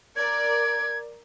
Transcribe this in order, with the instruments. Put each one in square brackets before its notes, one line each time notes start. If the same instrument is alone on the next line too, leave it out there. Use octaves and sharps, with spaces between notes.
[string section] A#4 D5 [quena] G#6